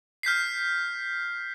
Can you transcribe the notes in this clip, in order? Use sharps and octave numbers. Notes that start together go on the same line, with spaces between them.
F6 G6 B6 C7